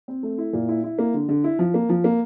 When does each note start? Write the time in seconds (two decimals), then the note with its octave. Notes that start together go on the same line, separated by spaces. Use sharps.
0.08 C4
0.23 A3
0.38 E4
0.53 A#2
0.68 E4
0.84 E4
0.98 A#3
1.14 D3
1.29 D3
1.44 E4
1.59 F3
1.74 A#3
1.89 F3
2.04 A#3